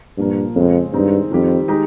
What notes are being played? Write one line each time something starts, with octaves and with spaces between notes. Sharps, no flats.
G2 A#2 F3 A#3
F2 C#3 G#3 C4
G2 D#3 G#3 C4 D#4
F2 D#3 G3 C4 G4
D#3 G#3 D#4 G4